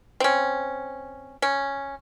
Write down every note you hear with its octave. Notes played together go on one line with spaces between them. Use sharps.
C4 C#4
C#4